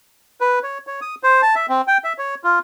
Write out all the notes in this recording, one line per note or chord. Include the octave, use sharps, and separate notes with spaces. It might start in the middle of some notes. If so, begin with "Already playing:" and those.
B4
C#5
C#5
D#6
C5
A5
E5
C4
G5
E5
C#5
F4